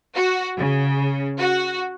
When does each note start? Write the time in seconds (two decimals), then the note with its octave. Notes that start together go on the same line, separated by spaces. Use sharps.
0.15 F#4
0.59 C#3
1.38 F#4